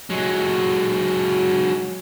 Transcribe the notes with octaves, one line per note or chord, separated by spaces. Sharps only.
F#3 G#3